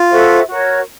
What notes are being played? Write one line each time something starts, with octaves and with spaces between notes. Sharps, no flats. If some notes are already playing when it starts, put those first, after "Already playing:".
Already playing: F4
F#4 A4 C5 E5
F#4 A#4 C#5